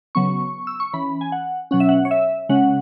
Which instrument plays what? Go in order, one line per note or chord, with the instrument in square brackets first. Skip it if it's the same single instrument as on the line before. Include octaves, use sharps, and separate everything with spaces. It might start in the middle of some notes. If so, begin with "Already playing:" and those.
[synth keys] C#3 F#3 B3 C#6
E6
C#6
E3 C#4 B5
G#5
F#5
B2 F#3 C#4 F#5
E5
F#5
C#5
E5
C#3 G#3 C#4 F#5